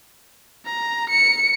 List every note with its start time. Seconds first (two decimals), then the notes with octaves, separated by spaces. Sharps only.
0.65 A#5
1.09 C#7